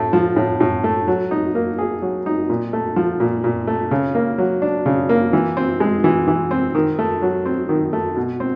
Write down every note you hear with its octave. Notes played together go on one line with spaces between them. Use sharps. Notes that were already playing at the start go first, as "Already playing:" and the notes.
Already playing: A2 A3
F3
A2
A2
A3
F#3
D#4
A#3
G#4
F#3
D#4
A#2
A3
F3
A#2
A#2
A3
C#3
A#3
F#3
D4
C#3
A#3
E3
C4
G#3
E3
E3
C4
D#3
A3
F#3
C4
D#3
A3
B2
C4